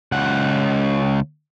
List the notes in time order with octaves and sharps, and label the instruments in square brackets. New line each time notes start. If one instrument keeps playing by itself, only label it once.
[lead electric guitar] C#2 F#5